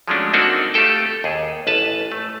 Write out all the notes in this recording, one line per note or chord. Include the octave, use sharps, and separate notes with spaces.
F3 F#3 G#3 A3 C#4 D4
A#3 C4 D4 D#4 F#4 A4
A3 F4 G4 A4 G5
D#2 G#4
A1 B4 A5
A3